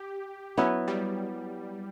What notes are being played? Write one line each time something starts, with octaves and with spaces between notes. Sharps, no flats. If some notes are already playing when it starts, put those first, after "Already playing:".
Already playing: G4
F#3 B3 C#4 E4 B4
G3